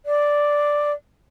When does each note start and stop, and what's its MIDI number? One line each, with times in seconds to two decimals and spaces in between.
0.05 0.92 74